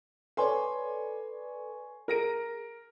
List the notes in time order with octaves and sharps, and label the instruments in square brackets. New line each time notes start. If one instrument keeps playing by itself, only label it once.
[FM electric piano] A4 B4 D5 [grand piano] C#5 G#5 C6
[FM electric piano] G#4 [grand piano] A#4 A#6 D7